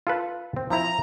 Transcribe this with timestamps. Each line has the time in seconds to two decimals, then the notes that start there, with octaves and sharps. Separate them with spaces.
0.07 F4 A4 B4
0.56 C4
0.70 F3 C4 E4 A#5